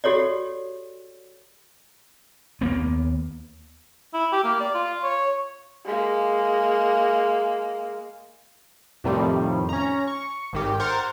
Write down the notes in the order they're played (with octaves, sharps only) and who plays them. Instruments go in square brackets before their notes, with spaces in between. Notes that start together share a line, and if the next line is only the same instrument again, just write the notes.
[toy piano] F#4 G4 A4 C#5 D5
[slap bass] D#2 A#3 B3
[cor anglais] E4
G4
A#3
D5
F4
C#5
[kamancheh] G#3 A#3
[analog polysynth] F2 A2 C3 D#3 F3 G3
C#4 A#5
C#6
G#1 D#3 G4
A#4 C5 F#5 A6